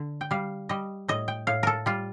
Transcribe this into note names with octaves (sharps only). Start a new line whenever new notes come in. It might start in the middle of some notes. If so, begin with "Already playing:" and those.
Already playing: D3
G5
G3 F5
G3 D#5
A2 D#5
G5
A2 F5
A4 A#4
G3 F4